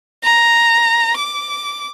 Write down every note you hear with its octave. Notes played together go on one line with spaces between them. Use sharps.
A#5
D6